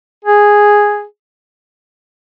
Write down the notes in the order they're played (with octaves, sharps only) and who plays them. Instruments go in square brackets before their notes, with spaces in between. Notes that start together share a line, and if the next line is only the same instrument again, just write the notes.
[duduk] G#4